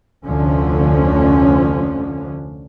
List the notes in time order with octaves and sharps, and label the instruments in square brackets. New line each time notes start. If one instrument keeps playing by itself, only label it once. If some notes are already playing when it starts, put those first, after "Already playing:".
[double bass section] F1 D2 D3 F3 C#4